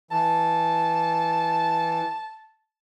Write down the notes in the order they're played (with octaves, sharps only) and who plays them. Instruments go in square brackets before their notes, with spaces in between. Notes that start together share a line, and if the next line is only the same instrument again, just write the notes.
[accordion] E3 [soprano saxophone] A5